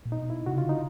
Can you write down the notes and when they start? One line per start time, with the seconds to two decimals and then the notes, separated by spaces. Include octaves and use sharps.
0.06 A#2
0.12 B2 D#4
0.30 E4
0.46 C3 F#4
0.55 C#3
0.58 F4
0.64 D3
0.69 C#3 D#4